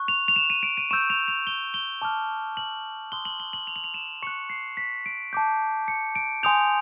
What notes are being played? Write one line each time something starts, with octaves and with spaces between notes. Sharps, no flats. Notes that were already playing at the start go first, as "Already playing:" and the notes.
Already playing: C#6 F#6
F7
F7
E7
D#7
D7
D#7
C#6 E6 G6 E7
F7
F7
G7
G7
A5 D6 F6
F#7
C6 D#6 F#6 G7
F#7
G7
F#7
F7
F#7
F7
E7
C#6 F#6 C#7
C7
B6
D7
A5 D6 G6
C#7
D7
G#5 C6 D#6 G6 F7